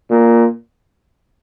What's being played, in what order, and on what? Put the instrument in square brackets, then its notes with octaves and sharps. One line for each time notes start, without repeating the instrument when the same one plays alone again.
[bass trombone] A#2